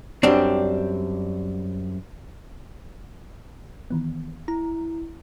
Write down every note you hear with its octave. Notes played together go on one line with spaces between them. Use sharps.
F#2 G3 C4 D4
D#3 E3 B3
E4 A#5